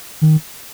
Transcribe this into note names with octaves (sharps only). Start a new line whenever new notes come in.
D#3